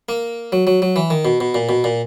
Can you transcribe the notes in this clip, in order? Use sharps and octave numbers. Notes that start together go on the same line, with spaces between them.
A#3
F#3
F#3
F#3
E3
D#3
B2
B2
A#2
B2
A#2